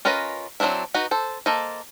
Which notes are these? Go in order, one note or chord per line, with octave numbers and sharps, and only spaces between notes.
C#4 F4 A#4 B4 D#5
F#3 A#3 C4 D4 E4
D#4 F#4 B4
A4 C5
A#3 A4 C5 D#5